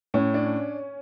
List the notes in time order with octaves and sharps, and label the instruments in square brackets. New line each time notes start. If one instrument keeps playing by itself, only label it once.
[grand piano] A2 [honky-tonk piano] C#4
[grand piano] D4